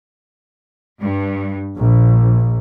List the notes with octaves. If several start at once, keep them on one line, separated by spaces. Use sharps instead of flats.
G2
A#1